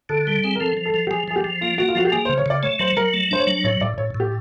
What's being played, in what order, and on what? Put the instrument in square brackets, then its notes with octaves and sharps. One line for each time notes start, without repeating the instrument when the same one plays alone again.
[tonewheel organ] D3 [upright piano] A4
[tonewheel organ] G3 [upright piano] A4
[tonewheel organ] C4 [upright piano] G#4
[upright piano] A#4
[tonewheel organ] F3 [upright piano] A4
[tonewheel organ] F3
[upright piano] A4
[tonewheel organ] F3
[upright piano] G4
[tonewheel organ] F3 [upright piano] G#4
[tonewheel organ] F3 [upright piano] G#4
[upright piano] G4
[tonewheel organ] F3
[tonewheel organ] A#3 [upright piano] F4
[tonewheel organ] A#3 [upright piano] F#4
[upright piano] F4
[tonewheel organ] F3 [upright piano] F#4
[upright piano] G4
[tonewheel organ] A#3 [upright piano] G#4
[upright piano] C5
[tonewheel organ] C#3
[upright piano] C#5
[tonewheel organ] C#3 [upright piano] D5
[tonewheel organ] A3 [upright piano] C#5
[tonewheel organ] F#3 [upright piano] C5
[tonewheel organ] F#3 [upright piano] A#4
[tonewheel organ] A3
[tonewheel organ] D4 [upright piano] C5
[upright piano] C#5
[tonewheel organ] F#3
[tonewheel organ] A2 [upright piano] C#5
[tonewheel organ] A2 [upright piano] D5
[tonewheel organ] A2 [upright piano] C#5
[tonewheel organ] A2
[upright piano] G4